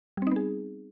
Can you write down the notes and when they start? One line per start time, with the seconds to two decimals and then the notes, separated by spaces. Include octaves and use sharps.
0.17 G3
0.22 C4
0.27 D#4
0.32 B3
0.36 G#4